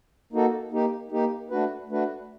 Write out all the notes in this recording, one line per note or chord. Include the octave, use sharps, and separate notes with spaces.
A#3 D#4 F#4 A4
A#3 D#4 G4
A#3 D#4 G4
A3 D4 F#4 B4
A3 D4 F#4 B4